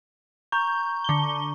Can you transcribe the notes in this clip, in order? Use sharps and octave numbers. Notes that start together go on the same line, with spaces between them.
A#5 C#6 G6
D3 G7